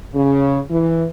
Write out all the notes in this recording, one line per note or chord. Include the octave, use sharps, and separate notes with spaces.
C#3
E3